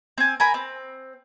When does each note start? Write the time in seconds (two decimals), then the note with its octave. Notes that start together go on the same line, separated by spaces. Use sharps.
0.18 C4 G#5
0.40 A#4 G#5 B5
0.54 C4